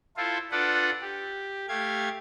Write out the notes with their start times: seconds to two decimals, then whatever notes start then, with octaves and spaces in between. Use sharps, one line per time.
0.17 E4 F4 A4 C5
0.52 D4 F4 A4 B4 D5 F#5
1.02 G4
1.69 A3 G4 F5 G#6